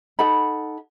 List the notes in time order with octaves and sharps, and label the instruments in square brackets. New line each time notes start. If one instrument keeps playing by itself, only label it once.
[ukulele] D#4 A4 F#5 B5